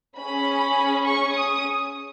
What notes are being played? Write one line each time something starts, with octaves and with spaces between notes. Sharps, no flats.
C#4 G#4 B5
C#6
D#6